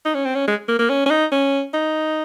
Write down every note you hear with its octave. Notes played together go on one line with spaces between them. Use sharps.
D#4
C#4
C4
C#4
G#3
A#3
A#3
C#4
C#4
D#4
C#4
D#4